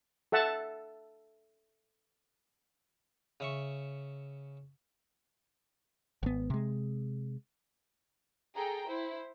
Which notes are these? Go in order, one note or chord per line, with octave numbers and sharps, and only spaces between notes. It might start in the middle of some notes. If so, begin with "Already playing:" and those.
A4 E5 F#5 A5
C#3 E5 C#6
G#1 B3
C3 G#3
G#4 A4 G5 A#5
E4 C5